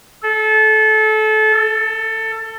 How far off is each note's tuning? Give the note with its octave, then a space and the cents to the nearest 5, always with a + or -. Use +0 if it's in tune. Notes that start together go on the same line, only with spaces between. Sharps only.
A4 -25
A4 +20